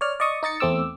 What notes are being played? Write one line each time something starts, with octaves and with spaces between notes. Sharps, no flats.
C#5 D5 F6
D5 D#5 C#6 D#6
D#4 D#5 A6 C#7
E2 A3 C4 D6 E6